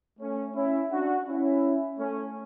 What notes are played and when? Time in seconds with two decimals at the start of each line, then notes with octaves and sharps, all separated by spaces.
0.20 A3 C#4
0.56 C#4 E4
0.92 D4 F#4
1.27 C#4 E4
1.98 A3 C#4